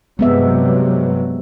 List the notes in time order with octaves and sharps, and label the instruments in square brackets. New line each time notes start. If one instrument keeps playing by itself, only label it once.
[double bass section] G2 C3 F#3 [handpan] G#3 B3 E5